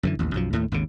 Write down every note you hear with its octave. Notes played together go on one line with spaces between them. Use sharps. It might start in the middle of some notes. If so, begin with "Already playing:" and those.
F#2 D3 E3
A1 D#2
B1 F#2 F3
D#2 A2 A3
G#1 D#2 C#3